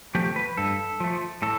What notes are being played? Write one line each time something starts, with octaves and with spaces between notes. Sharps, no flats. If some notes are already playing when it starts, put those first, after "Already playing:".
F3 A3 G4
B4
G2 A4
F3 A3
A2 A4